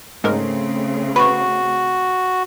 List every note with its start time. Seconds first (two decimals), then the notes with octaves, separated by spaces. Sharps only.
0.24 G#2 C#3 G#3 A3 C4 A#4
1.16 F#4 B4 B5 C#6